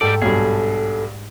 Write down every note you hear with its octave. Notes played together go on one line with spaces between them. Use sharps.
G#2 G3 G4 A4 D5
B1 G2 G#4 A4